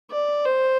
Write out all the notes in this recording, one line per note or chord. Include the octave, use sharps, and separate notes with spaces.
D5
C5